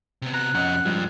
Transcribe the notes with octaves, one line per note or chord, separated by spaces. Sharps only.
C3 B3
A#5 F#6
F2 C4 C#4 D#5 F#5
G2 F3 G#3